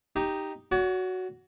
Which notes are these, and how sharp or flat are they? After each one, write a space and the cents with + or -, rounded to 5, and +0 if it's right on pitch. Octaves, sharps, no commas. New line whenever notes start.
D#4 +0 G4 +0
F#4 +0 C#5 +40